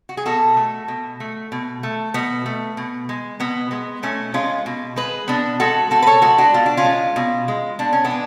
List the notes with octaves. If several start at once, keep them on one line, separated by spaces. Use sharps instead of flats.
F#4
G#4
B2 F#4 A4
A3
B2
A3
B2
A3
B2 B3
A3
B2
G#3
B2 B3
G#3 B3
B2 A3 C#4
G#3 C#4 F4
B2
G#3 G#4 B4
B2 B3 D4
G#3 F#4 A4
B2 F#4 A4
B4
A4 C#5
G#3 F#4 A4
D4 F#4
B2 F4
D4
C#4 F4
G#3
B2
G#3
B2 D4
C#4
B3 D4
G#3